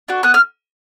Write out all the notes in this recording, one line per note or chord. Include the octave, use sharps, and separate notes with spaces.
D4 F#4
B3 F#6
F6